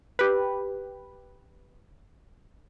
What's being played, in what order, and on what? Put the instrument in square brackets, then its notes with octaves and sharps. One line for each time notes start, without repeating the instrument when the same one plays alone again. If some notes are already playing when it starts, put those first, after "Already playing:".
[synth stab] G4 B4